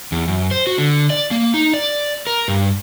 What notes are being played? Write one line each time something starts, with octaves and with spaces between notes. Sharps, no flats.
E2
F#2
C5
F#4
D3
D5
A#3
D#4
D5
A#4
G2